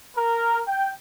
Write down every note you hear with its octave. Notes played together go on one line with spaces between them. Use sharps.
A#4
G5